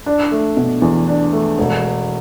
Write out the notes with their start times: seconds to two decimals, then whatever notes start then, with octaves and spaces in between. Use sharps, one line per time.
0.06 D4
0.31 A3
0.57 B2
0.82 E2
1.08 D4
1.33 A3
1.58 E1